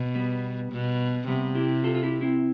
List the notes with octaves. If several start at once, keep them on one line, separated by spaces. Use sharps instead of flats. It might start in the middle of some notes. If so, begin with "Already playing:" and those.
Already playing: B2
G3 B3
B2
C3 G3 B3
E4 G4
F4 A4
F4
E4 G4
C4 E4